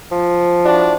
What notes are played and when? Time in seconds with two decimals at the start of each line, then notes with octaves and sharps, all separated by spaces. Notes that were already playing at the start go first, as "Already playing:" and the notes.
0.12 F3
0.65 D4 E4 F#4